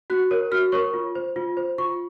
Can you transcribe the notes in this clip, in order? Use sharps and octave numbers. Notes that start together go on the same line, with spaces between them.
F#4 F#6
A#4 C#5
F#4 F6
A#4 C#5 C#6
F4
C5
F4
C5
F4 C#6